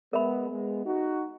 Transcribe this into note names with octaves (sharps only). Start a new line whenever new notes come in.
G#3 B3 A#4 E5 B5
G#3 B3
D#4 F#4